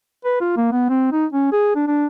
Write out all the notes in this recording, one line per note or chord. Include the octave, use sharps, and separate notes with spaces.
B4
F4
A#3
B3
C4
D#4
C#4
G#4
D4
D4